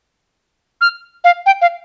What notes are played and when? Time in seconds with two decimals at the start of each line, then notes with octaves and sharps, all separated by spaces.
0.81 F6
1.24 F5
1.46 G5
1.61 F5